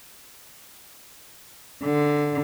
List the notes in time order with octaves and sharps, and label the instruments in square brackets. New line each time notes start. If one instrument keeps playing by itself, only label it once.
[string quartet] D3